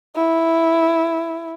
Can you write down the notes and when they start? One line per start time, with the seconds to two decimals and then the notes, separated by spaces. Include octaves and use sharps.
0.16 E4